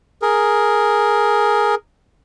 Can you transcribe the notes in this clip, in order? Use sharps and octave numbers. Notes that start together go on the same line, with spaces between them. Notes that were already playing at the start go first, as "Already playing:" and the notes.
G#4 A#4